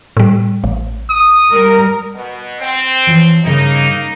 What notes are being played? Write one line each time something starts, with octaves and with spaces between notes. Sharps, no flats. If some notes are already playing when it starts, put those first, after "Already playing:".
A2 G3
A1
D#6
G3 A#4
B2
C4
E3 F3 C#5
G2 C#3 A#3 D#4 C#5